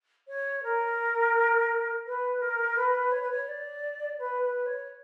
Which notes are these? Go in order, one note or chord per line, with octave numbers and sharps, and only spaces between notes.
C#5
A#4
B4
A#4
B4
C#5
B4
C#5
D5
B4
B4
C#5